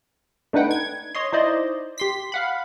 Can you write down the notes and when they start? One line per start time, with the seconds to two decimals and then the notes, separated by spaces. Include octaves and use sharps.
0.53 A3 D4 D#4 B4 F#5 G5
0.71 G#6
1.15 C#5 D#5 C6
1.32 D#4 E4 C5 D5 D#5
1.98 G4 C6 B6
2.32 F5 F#5 B5